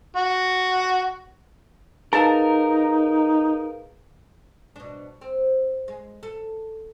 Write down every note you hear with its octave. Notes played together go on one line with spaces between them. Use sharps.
F#4
D#4 G#4 A#4 B4 F5 A5
B2 D4
C4
G#3
A4